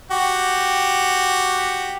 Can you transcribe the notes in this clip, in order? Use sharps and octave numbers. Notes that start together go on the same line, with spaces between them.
F#4 G4